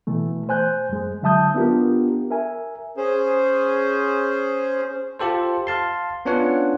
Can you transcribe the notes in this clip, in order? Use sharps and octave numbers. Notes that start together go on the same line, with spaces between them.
B2 E3 A3
C5 G#5 F#6 G6
F#2 G#3
D3 F#3 E5 A5 D#6 G6
B3 D4 F4 G4 A#4
A#4 E5 G#5
C#4 G#4 C5
F4 G4 A4 C5
F5 A5 C6
B3 C#4 D4 F4 C#5 F#5